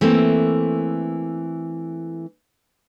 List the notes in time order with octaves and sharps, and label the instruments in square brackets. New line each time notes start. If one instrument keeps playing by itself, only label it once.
[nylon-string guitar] E3 A3 A#3 C4